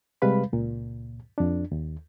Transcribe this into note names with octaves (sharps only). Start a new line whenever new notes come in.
C3 G3 G#3 B4 F5 B5
C#2 A#2
F2 D4
D#2